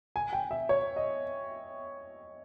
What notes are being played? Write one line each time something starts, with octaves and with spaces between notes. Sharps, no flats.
G#5
G5
E5
C#5
D#5